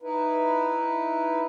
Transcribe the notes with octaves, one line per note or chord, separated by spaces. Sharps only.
D#4 E4 B4